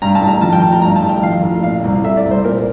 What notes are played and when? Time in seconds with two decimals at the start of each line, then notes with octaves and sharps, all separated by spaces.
0.02 G2 A#5
0.15 A5
0.22 A1
0.28 A#5
0.41 F3 A5
0.53 G5
0.62 A1 A5
0.72 A#5
0.82 G2 A#5
0.96 A5
1.02 A1
1.09 G5
1.23 F3 F5
1.43 A1
1.63 A#2 F5
1.84 C2
2.04 A3 E5
2.17 D5
2.25 C2
2.31 C5
2.44 A#2 A#4